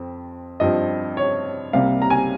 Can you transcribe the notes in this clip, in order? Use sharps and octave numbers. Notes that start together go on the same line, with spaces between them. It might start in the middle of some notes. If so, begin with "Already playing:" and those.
Already playing: F2 C4
G2 F3 C4 D#5
C#5
C2 C3 G3 A#3 F5
A#5
G#5